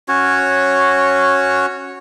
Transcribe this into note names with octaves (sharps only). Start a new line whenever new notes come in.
C#4 F#4 C#5